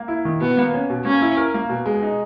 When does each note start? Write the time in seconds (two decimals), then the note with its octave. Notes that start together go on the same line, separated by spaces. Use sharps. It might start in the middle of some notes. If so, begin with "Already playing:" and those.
Already playing: A#3
0.08 E4
0.25 D#3
0.40 B2 B3
0.57 A#3
0.74 C#4
0.90 B2
1.05 A#3 C#4
1.22 E4
1.37 A#4
1.54 A#3
1.69 B2
1.86 G#3
2.03 D#4